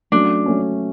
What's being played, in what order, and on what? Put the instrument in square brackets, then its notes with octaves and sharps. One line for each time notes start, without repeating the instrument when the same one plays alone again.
[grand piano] F#3 A3 C#4 [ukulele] D4
[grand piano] F#3 A3 C#4